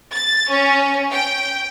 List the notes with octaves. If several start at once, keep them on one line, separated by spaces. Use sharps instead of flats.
A6
C#4
G5